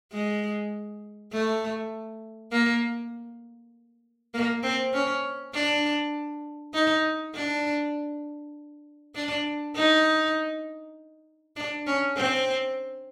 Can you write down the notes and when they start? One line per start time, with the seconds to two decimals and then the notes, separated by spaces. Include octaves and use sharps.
0.12 G#3
1.33 A3
2.52 A#3
4.34 A#3
4.63 C4
4.94 C#4
5.54 D4
6.74 D#4
7.35 D4
9.15 D4
9.76 D#4
11.56 D4
11.87 C#4
12.17 C4